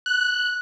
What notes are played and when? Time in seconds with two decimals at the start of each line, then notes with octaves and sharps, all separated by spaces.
0.06 F#6